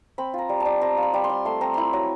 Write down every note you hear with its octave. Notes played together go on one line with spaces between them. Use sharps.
C4 B5
F4 A#5
G3
A5
G3
C4 A#5
F4
B5
G3
C6
G3
A3 C6
C4 A#5
E4 B5 C6
F#3 A#5